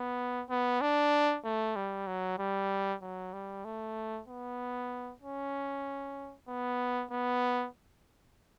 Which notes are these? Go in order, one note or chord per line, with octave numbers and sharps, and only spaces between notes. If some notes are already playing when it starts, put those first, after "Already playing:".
Already playing: B3
B3
D4
A3
G3
F#3
G3
F#3
G3
A3
B3
C#4
B3
B3